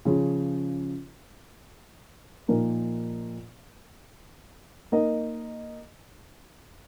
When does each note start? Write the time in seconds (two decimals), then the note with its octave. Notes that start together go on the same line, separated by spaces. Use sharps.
0.05 C#3 F3 C#4 F4
2.48 A#2 F3 A#3 D#4 A#4
4.92 A#3 D#4 A#4 D#5